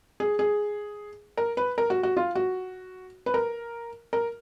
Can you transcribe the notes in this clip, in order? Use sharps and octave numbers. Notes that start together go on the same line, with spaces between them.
G#4
G#4
A#4
B4
A#4
F#4
F#4
F4
F#4
B4
A#4
A#4